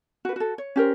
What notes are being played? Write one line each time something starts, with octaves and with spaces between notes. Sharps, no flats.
F#4 B4
F#4 A4
C#5
C#4 G4 A#4 C5